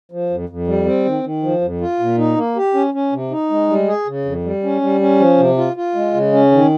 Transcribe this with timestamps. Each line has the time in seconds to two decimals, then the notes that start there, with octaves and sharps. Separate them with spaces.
0.12 F3
0.30 F2
0.49 F2
0.67 G3
0.86 C4
1.05 D#3
1.24 D#3
1.43 F3
1.61 F2
1.81 F4
2.00 A#2
2.18 D#4
2.36 A#3
2.56 G4
2.74 C#4
2.94 C#4
3.13 C3
3.31 D#4
3.50 G#3
3.69 G3
3.88 G#4
4.07 C#3
4.25 F2
4.44 G3
4.63 C#4
4.81 G3
5.01 C#4
5.20 F3
5.38 C3
5.57 F4
5.76 F4
5.95 G#3
6.14 C#3
6.33 C#4
6.52 D#3